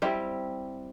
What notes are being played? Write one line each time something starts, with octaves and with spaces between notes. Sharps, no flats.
G3 C4 E4 G4